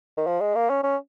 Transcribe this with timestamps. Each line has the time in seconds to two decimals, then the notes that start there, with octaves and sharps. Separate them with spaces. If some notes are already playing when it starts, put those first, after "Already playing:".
0.17 D#3
0.26 F3
0.41 G#3
0.55 A#3
0.70 C#4
0.83 C#4